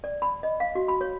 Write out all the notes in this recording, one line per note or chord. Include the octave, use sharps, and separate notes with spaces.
D5
B5
D#5
F5
F#4
B5
C#5